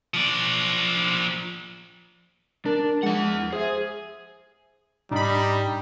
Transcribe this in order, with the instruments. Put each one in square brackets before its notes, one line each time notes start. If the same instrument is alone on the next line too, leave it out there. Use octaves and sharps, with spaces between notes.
[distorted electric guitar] F3 D5
[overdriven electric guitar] D4 [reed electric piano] A#4
[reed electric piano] F3 G#3 [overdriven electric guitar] E4 F#5
[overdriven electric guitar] G#4 [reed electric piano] C5 E5
[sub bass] G#2 [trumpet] G3 [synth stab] D4 B5 [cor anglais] D#4